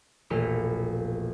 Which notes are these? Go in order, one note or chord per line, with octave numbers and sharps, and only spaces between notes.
E1 A#1 A3 F6 C#7 E7